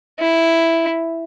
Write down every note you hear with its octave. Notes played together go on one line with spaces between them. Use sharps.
E4